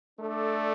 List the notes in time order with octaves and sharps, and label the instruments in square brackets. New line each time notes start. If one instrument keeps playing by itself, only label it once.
[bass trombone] A3 [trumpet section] D4 A4 D5